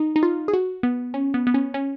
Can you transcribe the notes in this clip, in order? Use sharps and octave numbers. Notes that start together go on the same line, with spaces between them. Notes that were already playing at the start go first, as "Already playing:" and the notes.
Already playing: D#4
D#4
F4
G#4
F#4
B3
C#4
B3
B3
C#4
C#4